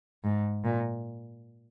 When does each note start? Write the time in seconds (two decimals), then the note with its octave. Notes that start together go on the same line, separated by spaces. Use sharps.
0.24 G#2
0.64 A#2